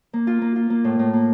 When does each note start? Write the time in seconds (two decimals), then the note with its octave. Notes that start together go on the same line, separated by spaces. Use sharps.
0.13 A#3
0.27 F4
0.42 A#3
0.56 F4
0.70 A#3
0.84 A2
0.99 A2
1.13 A#3